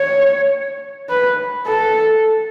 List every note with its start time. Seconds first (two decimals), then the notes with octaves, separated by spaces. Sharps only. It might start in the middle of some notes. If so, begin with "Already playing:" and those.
Already playing: C#5
1.10 B4
1.67 A4